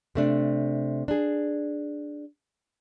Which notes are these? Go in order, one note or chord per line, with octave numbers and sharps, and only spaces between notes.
C3 A3 D4
D4 G#4